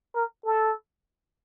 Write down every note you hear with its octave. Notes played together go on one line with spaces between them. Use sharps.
A#4
A4